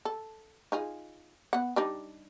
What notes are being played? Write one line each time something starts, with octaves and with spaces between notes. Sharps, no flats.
A4
D#4 F4 G#4
B3 F#5
G3 D4 D#4